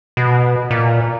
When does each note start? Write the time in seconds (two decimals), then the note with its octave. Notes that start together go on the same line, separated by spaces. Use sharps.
0.17 B2
0.71 A#2